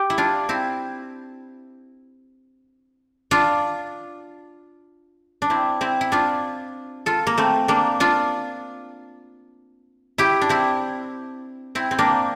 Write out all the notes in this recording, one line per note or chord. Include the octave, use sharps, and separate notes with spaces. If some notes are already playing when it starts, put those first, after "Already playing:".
Already playing: G4
E4
D4 F4
C4 E4
D4 F4
D4
C4 E4
C4 E4
E4
D4 F4
F4 A4
A#3
A3 C4
A#3 D4
D4 F4
E4 G4
D4
C4 E4
C4 E4
C4
A#3 D4